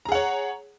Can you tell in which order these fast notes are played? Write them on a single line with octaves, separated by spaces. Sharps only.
A#5 G#4 F#5 C#5